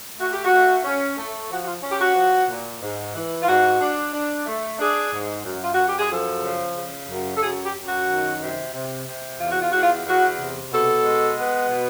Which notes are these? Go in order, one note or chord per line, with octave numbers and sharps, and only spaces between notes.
A3 F#4
G4
F#4
A3
C#4
A3
F3 F#4
F#4
F4
C#4
G4
F#4
F3
A#2
G#2
E3
F4
G#2 F#4
D4
D4
A3
D4 G#4
G#2
F#2
F4
F#2 F#4
G4
G#4
F3 A4
C#3
C#3
F#2
A4
F#2 G#4
G4
F#2
F#4
D#3
C3
C3
C3
E2 F4
F#4
F4
E2 F#4
F4
E2 F#4
C3
B2 A4
G#3
B3
B2